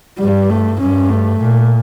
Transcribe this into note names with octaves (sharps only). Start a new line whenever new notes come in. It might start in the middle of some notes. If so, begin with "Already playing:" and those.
G2 G3
A3
G2 C#4
A3
A#2